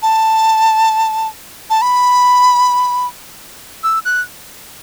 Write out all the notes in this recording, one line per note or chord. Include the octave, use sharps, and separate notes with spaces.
A5
A5
B5
E6
F#6